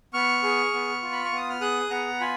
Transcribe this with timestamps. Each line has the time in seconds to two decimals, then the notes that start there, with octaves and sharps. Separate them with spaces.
0.13 B3 C#6 F6
0.43 G#4
0.73 B3
1.02 F4
1.12 B5
1.25 C#6
1.32 B3 D#6
1.50 F6
1.61 G#4 D#6 F#6
1.90 B3 F#5 A#5
2.20 F4 G#5 B5